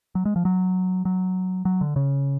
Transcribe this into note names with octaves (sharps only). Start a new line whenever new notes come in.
F#3
G#3
F3
F#3
F#3
F#3
D3
C#3